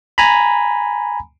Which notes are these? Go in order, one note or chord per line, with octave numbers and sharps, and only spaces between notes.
G#5 A#5 B5